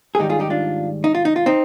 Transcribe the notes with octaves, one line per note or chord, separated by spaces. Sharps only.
G#4
G#2 D#3 G3 D#4 G4
F4 G#4
D#4 G4
D4 F4
D#4
F4
D#4
F4
C4 D#4